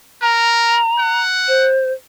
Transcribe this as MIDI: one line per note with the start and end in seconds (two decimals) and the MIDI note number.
0.22 0.79 70
0.22 1.21 82
0.99 1.69 78
1.48 1.92 72